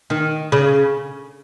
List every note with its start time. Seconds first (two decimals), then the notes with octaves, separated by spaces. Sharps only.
0.10 D#3
0.52 C#3